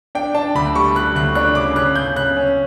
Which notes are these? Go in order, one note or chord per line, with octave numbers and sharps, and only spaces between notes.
D4 G5
D4 A5
D2 B5
G3 C#6
G3 F#6
D2 F#6
D4 F#6
C#3 D6
C#3 F#6
C#3 G6
C#3 F#6
C#4